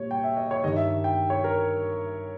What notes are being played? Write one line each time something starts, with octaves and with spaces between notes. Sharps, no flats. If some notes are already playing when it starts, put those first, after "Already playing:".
Already playing: A#2 G3 C#5
G5
E5
D#5
C#5
G2 D#3 G3 D#5
E5
G5
C#5
A#4